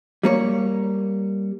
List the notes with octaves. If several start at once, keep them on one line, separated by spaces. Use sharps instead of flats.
G3 A#3 C#5